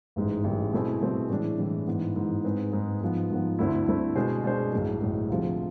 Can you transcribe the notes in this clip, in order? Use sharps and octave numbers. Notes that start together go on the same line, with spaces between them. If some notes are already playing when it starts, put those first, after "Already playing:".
A1 G#2 G#3
A1 G#2 G#3
B2 A3 C4 E4 G#4
B2 A3 C4 E4 G#4
A2 E3 G#3 D4
A2 E3 G#3 D4
G#2 E3 B3
G#2 E3 B3
G#2 G#3 C4 G#4 B4
G#2 G#3 C4 G#4 B4
G#2 F3 B3
G#2 F3 B3
D2 D3 A3 C4 E4
D2 D3 A3 C4 E4
B2 G#3 D4 G#4 C5
B2 G#3 D4 G#4 C5
B1 A2 G#3
B1 A2 G#3
D2 C3 F3 G#3 C4